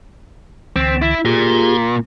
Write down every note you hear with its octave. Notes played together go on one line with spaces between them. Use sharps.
C#2 D3 E3 C4
E4
A#2 F4 G4 G#4